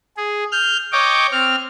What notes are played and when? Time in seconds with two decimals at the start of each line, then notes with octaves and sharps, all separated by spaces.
0.17 G#4
0.52 F6 G6
0.92 C#5 D#5 G5 D6
1.32 C4 F6